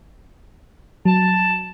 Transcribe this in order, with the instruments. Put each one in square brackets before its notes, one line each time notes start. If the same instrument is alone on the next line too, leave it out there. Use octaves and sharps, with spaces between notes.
[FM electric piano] F#3 [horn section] A5